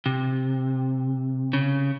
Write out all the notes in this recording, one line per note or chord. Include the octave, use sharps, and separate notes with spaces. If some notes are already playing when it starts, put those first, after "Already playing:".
C3
C#3